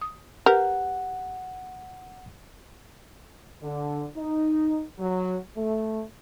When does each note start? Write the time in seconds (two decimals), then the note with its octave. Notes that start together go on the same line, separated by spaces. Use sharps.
0.01 D#6
0.46 G4 A#4 B4 F#5
3.62 D3
4.16 D#4
4.99 F#3
5.56 A3